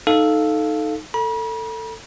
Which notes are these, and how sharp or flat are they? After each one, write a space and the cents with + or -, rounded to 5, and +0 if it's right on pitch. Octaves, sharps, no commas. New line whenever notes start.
D#4 +0 A4 -5 F5 +0
A4 +20 B5 -45